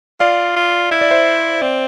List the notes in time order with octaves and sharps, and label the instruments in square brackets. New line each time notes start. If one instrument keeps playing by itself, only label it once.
[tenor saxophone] F4 [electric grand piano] D5 F5
[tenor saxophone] F4
[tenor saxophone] E4 [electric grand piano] E5
[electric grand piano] D5
C5 E5
[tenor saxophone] C4 [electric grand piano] D5